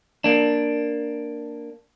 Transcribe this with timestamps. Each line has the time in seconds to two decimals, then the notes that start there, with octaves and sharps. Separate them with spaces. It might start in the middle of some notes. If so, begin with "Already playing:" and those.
0.24 A#3 D4